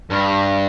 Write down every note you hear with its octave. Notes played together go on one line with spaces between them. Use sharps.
G2